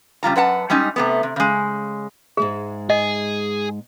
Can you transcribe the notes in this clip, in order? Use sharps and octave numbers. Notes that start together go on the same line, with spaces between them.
C#3 G3 F4 A#5
F#2 B4 F#5 A5
G3 G#3 C#4 D#4
C3 A3 B3
C3
C#3 G#3
G#2 G#3 G#4 E5
G#4 D#5